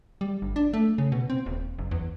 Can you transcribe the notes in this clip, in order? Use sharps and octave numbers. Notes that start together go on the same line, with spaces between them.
G3
G1
D4
A3
C#3
B2
C4
D#1
F#1
E2